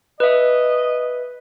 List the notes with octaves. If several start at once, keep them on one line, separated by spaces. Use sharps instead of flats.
B4 D#5 E5